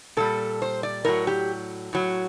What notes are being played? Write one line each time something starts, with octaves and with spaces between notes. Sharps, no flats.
A#2 G3 A4
C5
D5
A2 F#3 A#4
G4
A2 F#3